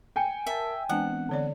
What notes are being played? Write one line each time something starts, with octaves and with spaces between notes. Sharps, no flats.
G5 G#5 C#7
A#4 E5 A5
E3 G#3 B3 C4 D4 F#5
D3 C#5 D5